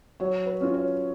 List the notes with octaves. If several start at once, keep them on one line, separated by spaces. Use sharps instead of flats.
F#3 C#5
B4
C#4 F4
C#5